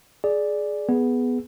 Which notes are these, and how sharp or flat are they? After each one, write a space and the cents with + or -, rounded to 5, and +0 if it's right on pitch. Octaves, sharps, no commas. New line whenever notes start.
G#4 +15 D5 +0
B3 +0 G#4 +0